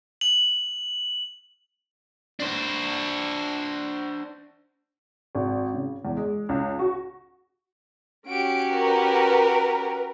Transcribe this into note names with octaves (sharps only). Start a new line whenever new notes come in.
F#7
D4 C5
G#1
C#3
E2
G#3
C#2
F#4
C#4 F#4 G4 D7
A#4 B4